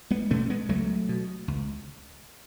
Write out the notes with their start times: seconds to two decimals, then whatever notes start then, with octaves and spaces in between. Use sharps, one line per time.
0.11 G#3 B3
0.31 B2 A3 C#4
0.50 G#3 B3
0.69 C#2 F#3 A3
1.09 B2
1.48 C#2